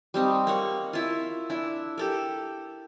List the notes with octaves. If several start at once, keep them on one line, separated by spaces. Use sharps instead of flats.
G3 C4 D#4
A#3 C#5 F#5 C#6
E4 F4
D4 E4
G4 A4 A#4